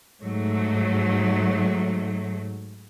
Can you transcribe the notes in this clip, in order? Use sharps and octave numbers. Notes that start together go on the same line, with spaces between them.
G#2 F#3 A3